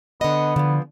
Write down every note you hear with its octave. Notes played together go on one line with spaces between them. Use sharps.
D3 B3 D#5
D3 E3 F3